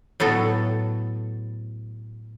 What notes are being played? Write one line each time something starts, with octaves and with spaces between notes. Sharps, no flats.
A2 F#3 B3 A4